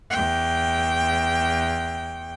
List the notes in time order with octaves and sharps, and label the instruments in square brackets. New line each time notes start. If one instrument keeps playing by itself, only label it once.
[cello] E2 G5